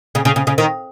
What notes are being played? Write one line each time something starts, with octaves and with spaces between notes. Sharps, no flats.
C#3
C#3
C#3
C#3
D#3